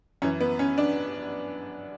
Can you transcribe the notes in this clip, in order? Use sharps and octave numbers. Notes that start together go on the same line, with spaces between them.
F#2 E3 C#4
B3
C#4
D4